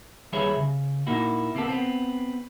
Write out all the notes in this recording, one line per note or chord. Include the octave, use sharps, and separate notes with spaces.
D#2 G3 G#4 B4 C#5 E5
C#3
A#2 A#3 D#4 E4 F#4
C3 A#3 B3 A4
B3 C4